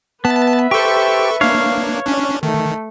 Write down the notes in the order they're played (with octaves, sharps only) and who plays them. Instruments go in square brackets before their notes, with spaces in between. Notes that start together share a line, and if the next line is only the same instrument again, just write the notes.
[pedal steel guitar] B3 [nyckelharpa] B4 E5 [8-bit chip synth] A5
[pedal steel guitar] G4 C5 [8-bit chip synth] A4 C#6
[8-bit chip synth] A#3 D4 [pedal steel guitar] C#5 F5
[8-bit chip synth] C#4 D4
[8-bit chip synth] D#3 [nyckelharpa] A3